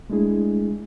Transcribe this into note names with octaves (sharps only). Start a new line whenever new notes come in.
G#3 A3 D4 E4 G#4